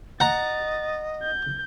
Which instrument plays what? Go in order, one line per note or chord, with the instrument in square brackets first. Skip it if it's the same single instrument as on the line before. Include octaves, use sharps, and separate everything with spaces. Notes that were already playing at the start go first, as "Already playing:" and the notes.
[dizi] D#5 [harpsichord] F#5 A#5 [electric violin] A6
[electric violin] G6